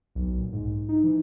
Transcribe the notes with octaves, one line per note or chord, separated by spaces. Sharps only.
B1
A#2
G#2
D#4
E3